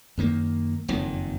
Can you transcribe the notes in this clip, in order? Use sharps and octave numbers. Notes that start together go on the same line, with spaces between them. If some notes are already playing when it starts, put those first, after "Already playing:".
F#2 D#3 A#3
F#1 F2 D#3